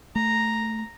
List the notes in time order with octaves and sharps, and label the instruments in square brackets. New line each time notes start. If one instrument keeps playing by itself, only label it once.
[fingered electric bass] A3 [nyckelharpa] A#5